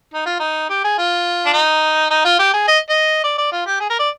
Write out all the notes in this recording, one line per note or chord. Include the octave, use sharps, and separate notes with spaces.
D#4
F4
D#4
G4
G#4
F4
D4
D#4
D#4
F4
G4
G#4
D#5
D#5
D5
D5
F4
G4
G#4
A#4
D5